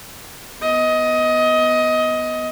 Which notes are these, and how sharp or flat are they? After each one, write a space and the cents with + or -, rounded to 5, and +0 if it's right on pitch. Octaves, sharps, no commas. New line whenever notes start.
B3 +0 D#5 +20